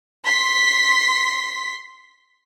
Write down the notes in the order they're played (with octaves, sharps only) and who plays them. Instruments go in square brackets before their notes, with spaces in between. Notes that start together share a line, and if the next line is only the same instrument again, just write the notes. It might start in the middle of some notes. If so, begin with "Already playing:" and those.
[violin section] C6 B6